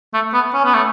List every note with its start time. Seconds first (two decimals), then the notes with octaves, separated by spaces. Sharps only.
0.14 A3
0.34 B3
0.54 C#4
0.65 B3
0.74 A3